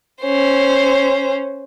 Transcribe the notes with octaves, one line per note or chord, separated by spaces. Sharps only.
C#4 C5